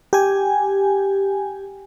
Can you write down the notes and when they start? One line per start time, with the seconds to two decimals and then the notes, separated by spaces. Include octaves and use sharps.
0.13 G4 G#5